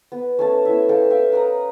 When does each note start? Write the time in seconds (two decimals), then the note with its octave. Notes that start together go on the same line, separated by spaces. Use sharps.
0.12 B3
0.39 A3 C#4 A5
0.65 B3 E4 E5
0.89 G#4 A4 F5 G5
1.10 E5 F5 G5
1.32 A#4 B4 D#5 A#5